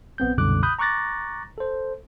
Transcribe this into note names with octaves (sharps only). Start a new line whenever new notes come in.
A#1 B3 C4 G6
C2 F#2 B2 D3 D6 F#6
B5 D#6 F#6 G6
A#5 C#6 D6 F#6 A6 A#6
A4 C5